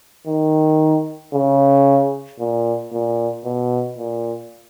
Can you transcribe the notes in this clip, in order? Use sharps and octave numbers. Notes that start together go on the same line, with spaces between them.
D#3
C#3
A#2
A#2
B2
A#2